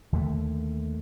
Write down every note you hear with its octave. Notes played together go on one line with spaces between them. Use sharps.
D#2 D3 D#3 A3